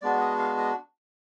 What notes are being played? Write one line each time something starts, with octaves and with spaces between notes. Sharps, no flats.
G#3 B3 D4 F#4 D5
D#5
F5
D#5